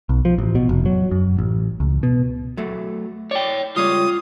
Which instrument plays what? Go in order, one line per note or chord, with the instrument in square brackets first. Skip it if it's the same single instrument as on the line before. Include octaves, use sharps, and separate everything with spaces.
[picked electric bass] B1
F3
A1
B2
F1
F#3
F#2
A1
C#2
B2
[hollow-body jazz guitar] F#3 A3
[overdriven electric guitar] C#5 G5 [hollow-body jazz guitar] D5
[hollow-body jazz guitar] C#2 G3 C#5 [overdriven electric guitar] F4 [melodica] D#6